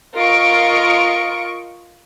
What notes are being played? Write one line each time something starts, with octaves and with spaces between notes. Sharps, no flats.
F4 A#4 D#5 C#6 D7